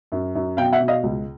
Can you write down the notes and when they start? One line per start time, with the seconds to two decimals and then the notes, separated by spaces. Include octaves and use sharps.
0.12 F#2
0.35 F#2
0.57 B2 F5 G5
0.72 E5 F#5
0.80 B2
0.88 D#5 F5
1.03 C#2